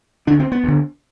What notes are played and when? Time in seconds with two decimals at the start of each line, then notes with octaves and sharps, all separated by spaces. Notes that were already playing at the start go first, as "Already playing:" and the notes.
0.27 D3 D4
0.30 D2
0.39 C4
0.52 B3
0.64 D2 D3